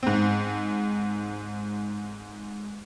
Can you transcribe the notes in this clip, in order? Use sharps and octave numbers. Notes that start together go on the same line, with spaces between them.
G#2 C4